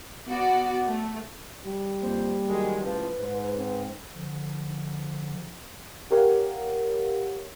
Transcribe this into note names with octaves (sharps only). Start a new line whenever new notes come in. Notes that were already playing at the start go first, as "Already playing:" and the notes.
B3 F#4 D5
A3
G3
F2 A#3 C5
D#3 F#3 G#3
C#2 A2 F3 B4
G#2 C5
C4
D3 F3
G4 A#4 C#5 F5 F#5